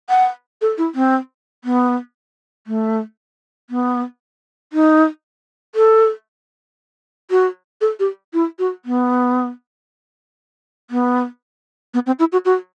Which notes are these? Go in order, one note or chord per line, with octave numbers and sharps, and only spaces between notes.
F#5
A4
E4
C4
B3
A3
B3
D#4
A4
F#4
A4
G4
E4
F#4
B3
B3
B3
C4
E4
F#4
F#4